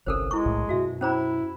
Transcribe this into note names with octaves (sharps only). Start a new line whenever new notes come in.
G1 C2 C#4 A4 A#4 C5
G#3 E4 C#6
B1 A2
F#2 B2 F#4 E5
C#4 E4 C5 A#5